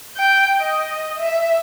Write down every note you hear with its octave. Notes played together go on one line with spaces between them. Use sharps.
G5
D#5
E5